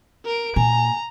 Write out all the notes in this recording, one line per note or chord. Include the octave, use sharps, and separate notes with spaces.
A#4 D7
A#2 G#5 A#5